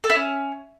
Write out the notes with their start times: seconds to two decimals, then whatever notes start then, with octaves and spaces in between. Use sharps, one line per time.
0.04 A4
0.10 E4
0.15 C#4